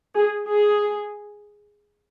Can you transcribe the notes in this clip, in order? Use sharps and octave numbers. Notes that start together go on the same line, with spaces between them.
G#4
G#4